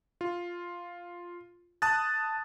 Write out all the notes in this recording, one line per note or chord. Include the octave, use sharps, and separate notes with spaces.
F4
A5 D#6 F#6 A6